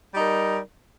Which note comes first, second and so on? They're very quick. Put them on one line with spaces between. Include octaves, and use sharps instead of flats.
G3 D#4 A#4